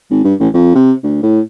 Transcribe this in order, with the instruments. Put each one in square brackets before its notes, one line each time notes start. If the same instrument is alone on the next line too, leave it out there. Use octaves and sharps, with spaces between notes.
[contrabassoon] G#1
G2
A1
F2
C3
D2
A2